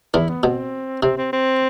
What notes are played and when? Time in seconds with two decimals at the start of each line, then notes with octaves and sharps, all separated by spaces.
0.14 E2 E3 E4
0.29 B3
0.43 B2 C4
1.03 C3 C4
1.18 C4
1.33 C4